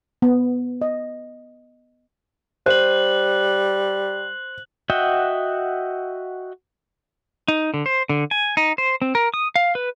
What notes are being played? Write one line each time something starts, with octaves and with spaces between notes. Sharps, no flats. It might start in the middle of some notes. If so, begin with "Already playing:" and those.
B3
D#5
G3 C5 F#6 F#7
F#4 D#5 E5 F#5 G5
D#4
D3
C5
D3
G#5
D#4
C5
C4
A#4
D#6
F5
B4